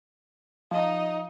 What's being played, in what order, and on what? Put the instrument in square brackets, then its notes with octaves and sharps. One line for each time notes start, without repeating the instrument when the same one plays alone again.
[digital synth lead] F3 [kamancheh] D#4 D#5